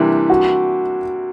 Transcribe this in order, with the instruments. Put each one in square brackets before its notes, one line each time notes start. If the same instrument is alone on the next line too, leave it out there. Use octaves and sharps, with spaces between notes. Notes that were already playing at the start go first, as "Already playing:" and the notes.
Already playing: [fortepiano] C3 E3 G3 A#3 D4 [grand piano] E4
[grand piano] F#4